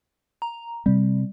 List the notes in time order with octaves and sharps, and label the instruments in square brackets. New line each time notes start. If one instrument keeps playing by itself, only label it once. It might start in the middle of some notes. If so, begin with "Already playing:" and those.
[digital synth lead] A#5
[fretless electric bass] C3 C4 [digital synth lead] G3